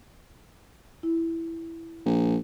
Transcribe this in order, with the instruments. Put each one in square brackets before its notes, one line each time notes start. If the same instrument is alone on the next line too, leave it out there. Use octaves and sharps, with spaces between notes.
[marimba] E4
[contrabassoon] A#1